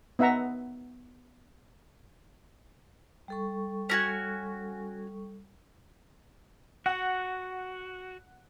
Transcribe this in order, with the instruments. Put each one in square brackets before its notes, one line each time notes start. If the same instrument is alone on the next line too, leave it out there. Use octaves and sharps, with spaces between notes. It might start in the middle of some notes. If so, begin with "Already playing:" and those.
[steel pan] B3 D#4 E5 F#5 A#5
[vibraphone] G3 A4 C#6
[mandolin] C#4 F#4 G#5
[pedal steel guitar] F#4 [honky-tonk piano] F#5